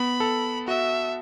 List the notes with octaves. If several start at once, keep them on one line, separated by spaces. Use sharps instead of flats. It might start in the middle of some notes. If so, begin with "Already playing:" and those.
Already playing: B3 B5
A4
F#4 E5